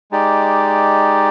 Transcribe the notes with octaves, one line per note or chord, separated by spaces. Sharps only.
G#3 D#4 G4 D5